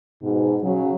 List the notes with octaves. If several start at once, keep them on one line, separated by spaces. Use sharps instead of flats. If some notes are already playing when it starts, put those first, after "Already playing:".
G#2 B2
C#3 F#3